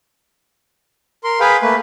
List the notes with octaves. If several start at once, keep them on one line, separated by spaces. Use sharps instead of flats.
A#4 C6
G#4 B4 F5 G5 B5
A3 A#3 B4